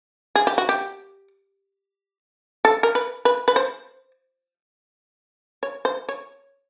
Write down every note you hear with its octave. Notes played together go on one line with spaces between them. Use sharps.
G#4
G4
F#4
G4
A4
A#4
B4
B4
B4
C5
C#5
C5
C#5